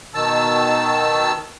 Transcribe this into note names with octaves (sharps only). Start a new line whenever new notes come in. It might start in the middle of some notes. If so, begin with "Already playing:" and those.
B2 D#3 A5 E6